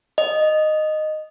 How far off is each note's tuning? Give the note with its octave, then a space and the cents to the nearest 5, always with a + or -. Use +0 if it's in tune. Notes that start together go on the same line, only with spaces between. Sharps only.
D#5 -10